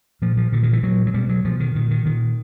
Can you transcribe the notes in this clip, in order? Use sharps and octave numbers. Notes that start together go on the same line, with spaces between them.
A#2 F3
F3
A#2 D3
D#3
E3
A#2 F#3
F#3
B2 G3
F#3
B2 F3
D#3
A#2 D#3
D#3
A#2 D#3